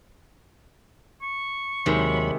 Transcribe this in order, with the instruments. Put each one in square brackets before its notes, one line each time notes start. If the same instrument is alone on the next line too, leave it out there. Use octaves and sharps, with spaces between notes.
[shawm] C#6
[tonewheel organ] D#2 F#3 B5 [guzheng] C3 D#3 G#3